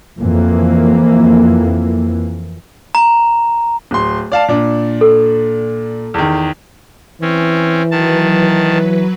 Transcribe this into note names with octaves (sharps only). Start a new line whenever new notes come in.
F2 E3 A#3
A#5
D1 C6
D5 F5 A5
A#2 D4
A4
E2 D#3
E3 C4 C#4
D#3 F#3 B4 A5